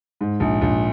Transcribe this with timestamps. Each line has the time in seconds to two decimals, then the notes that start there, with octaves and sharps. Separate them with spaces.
0.21 G#2
0.40 A#1
0.61 A#1